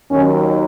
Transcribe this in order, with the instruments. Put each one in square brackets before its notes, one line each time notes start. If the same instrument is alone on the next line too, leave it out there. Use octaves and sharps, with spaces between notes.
[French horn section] D#2 D#3 F#3 C#4